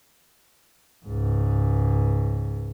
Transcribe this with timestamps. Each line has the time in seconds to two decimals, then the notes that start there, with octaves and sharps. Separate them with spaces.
1.06 C#2 G#2